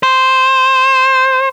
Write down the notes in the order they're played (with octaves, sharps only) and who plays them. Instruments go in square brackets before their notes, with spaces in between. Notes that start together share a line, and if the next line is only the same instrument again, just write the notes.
[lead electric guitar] C5